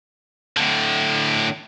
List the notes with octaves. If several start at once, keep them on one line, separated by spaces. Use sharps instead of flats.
A2 D3